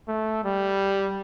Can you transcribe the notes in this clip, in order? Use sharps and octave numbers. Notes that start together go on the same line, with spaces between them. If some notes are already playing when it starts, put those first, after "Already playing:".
A3
G3